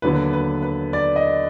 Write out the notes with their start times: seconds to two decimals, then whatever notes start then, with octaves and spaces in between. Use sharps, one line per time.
0.02 D#2 D3 F#3 B3 B4
0.33 B4
0.62 B4
0.93 D5
1.16 D#5